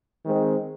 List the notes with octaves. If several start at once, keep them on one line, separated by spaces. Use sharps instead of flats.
D#3 G#3 C4